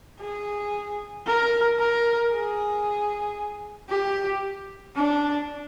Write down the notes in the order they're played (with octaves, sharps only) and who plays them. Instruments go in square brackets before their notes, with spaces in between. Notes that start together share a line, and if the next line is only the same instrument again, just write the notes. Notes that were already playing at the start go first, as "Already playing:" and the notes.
[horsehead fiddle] G#4
A#4
A#4
G#4
G4
D4